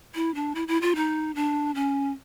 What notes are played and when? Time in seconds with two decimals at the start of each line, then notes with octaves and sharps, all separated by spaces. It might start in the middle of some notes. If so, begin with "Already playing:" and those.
0.15 E4
0.35 D4
0.55 E4
0.68 E4
0.81 F4
0.96 D#4
1.35 D4
1.75 C#4